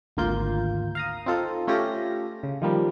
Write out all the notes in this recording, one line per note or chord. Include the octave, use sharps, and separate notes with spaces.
G#1 D2 A#3 F4 G6
F5 A#5 D#6
C4 D#4 F4 A4
A3 C#4 F4 G4 A4 A#6
C#3
D#3 F3 G3 A#3